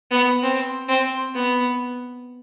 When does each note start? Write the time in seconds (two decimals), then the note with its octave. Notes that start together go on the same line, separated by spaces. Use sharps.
0.11 B3
0.43 C4
0.89 C4
1.35 B3